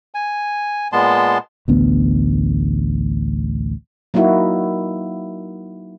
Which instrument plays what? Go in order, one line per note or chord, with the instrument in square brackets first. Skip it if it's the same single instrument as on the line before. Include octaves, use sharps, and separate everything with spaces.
[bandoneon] G#5
A#2 G#3 B3 A5 C6
[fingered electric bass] A1 D2 B3
[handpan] F#3 A#3 D#4 E4 F#4